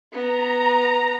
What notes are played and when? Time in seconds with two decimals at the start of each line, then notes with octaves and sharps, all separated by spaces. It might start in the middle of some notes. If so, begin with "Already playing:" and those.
0.13 B3 A#5